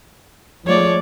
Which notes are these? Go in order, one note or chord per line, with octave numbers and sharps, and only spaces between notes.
F3 G#3 A3 C#5 D5